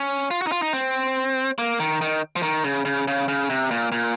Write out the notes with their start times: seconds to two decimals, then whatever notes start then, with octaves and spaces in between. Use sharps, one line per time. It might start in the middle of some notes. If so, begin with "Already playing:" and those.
Already playing: C#4
0.31 F4
0.42 F#4
0.47 D#4
0.52 F4
0.62 D#4
0.73 C4
1.58 A#3
1.80 D#3
2.01 D#3
2.36 F3
2.43 D#3
2.64 C#3
2.85 C#3
3.08 C#3
3.28 C#3
3.50 C3
3.71 A#2
3.92 A#2